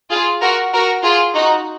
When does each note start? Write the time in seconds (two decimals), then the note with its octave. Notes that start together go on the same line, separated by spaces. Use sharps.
0.10 F4 G#4
0.41 F#4 A#4
0.73 F#4 A#4
1.04 F4 G#4
1.35 D#4 F#4